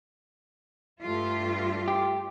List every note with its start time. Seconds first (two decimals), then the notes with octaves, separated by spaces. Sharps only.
1.03 G2 A3 F4
1.88 G4